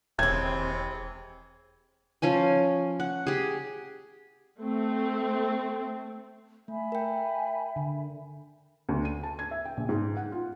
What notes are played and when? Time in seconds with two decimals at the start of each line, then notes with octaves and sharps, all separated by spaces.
0.19 E1 D#2 C3 E3 G#3 C4 G#6
2.22 F3 C#4 G#5
3.00 F#5
3.27 G4 G#4
4.60 A3 C4
6.68 A3 E5 G#5 B5
6.92 A#4 G5
7.76 D3
8.89 D2
9.05 D#7
9.23 A5
9.39 G#6
9.51 E5
9.65 G5
9.77 A#1
9.89 G#2
10.17 F#5
10.32 F4